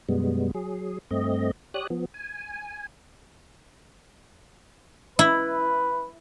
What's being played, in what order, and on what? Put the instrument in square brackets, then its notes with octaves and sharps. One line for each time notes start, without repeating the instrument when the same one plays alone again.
[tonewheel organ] F#2 B2 G3 G#3 B3
F#3 G#4
G2 A3 C4 D#5
G4 C#5 D5 D#6 F#6
F3 B3
G#5
[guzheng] E4 [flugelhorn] B4